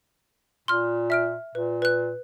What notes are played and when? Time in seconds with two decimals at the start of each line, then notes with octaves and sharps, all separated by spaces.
0.68 A#2 C6 F6
1.10 E5 F6 D7
1.55 A#2 B4
1.82 B4 F#6